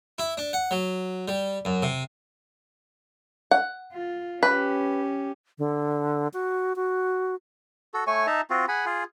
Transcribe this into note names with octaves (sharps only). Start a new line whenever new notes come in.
E4
D4
F#5
F#3
G3
F#2
C3
F#5
F4
C#4 G4 B4
D3
F#4
F#4
F#4 A4
A3 C#5 G#5 C#6
D#4 E5 A5 A#5
C4 F4 F#4
G#4 F#5 G#5 B5
F4 G#4